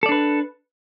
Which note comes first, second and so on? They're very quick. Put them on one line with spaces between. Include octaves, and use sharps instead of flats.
A4 D5 D4 B4